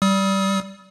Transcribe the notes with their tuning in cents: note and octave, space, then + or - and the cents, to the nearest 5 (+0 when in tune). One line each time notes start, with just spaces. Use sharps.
G3 -15 D#6 +35